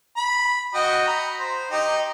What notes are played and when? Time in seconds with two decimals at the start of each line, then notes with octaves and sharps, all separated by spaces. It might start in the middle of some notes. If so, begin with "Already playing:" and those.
0.17 B5
0.74 F#4 D#5 G5
1.07 A#5 B5
1.39 C5
1.71 D#4 G4